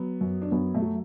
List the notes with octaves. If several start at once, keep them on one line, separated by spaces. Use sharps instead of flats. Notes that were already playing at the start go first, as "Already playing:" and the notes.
Already playing: F#3 B3
F#2
D4
F#2 B3
A3
F#3